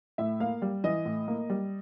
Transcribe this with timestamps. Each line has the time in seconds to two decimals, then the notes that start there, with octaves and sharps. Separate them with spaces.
0.18 A2 E5
0.40 A#3 F5
0.62 G3
0.84 E3 D#5
1.05 A2
1.28 A#3
1.50 G3